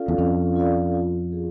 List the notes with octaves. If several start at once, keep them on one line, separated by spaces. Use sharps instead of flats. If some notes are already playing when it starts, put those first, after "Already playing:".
Already playing: C#4 F4 A4 D5 F5
E2
F2 C#4
F4 A4 D5 F5
F4
G#4